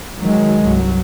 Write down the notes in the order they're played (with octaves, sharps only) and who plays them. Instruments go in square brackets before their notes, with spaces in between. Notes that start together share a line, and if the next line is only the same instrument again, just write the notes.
[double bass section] D#3 F#3 [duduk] G#3
[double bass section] C2 G2 F#3